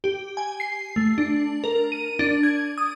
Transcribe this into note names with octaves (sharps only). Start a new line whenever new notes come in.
G4
G#5
C7
A3
D4
A#4
D#7
D4
G#6
D#6